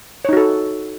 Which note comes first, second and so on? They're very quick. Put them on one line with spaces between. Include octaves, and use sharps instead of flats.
C#5 D#4 F#4 A4